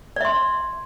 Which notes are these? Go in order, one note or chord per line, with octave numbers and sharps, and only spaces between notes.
D5 E5 C6